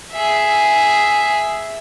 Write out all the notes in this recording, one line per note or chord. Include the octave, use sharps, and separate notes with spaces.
G#4 E5